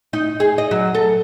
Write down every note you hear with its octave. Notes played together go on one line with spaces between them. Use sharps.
D#4
G#4
D#5
F#3
A4